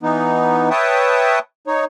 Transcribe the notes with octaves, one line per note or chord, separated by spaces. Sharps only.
E3 B3 D#4
B4 C#5 E5 G5 A5 D#6
D#4 C#5